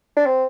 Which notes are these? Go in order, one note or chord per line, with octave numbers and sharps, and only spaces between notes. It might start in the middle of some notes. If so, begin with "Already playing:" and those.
D4
C4